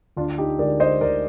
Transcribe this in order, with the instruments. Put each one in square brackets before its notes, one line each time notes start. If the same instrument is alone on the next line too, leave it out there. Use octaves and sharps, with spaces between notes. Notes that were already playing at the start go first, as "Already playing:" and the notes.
[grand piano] D2 D4 F4
D#4 G4
D3 G#3 A#4 D5
C5 D#5
D2 A#4 D5